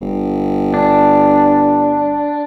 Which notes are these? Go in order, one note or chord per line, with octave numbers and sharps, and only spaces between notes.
G1
D4